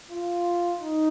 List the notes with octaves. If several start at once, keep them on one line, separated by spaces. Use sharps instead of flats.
F4
D#4